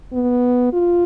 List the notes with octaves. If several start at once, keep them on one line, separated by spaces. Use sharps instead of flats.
B3
F4